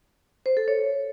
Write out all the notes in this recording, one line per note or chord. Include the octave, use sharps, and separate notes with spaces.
C5
A4
C#5